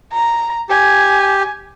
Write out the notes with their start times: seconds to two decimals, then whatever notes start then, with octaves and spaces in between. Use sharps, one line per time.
0.13 A#5
0.69 G4 G#5